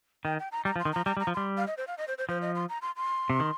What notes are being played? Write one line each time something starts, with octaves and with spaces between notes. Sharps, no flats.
D#3 G5
G5
A#5
G3 A#5
F3
C6
D#3
F3 A#5
G3 A#5
G3
A#5
F3
G3 C6
F5
D#5
C5
F5
D#5
C5
C5
F3 C5
D#5
C6
A#5
C6
C6
C3
D#3